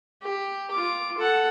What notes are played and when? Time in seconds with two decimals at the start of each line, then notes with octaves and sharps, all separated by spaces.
0.22 G4
0.71 F4 D6
1.18 A4 F#5